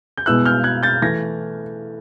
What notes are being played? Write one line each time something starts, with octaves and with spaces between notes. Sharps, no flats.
G6
B2 G#3 B3 E4 E6 F#6
F6 G6
F#6 G#6
G6 A6
E3 A3 G#6 A#6